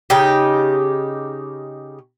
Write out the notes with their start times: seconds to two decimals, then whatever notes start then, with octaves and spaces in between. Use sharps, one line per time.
0.10 C#3 D#4 G4